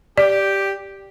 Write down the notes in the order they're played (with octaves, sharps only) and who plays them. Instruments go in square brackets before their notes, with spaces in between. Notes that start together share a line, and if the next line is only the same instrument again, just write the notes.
[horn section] G4 [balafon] D5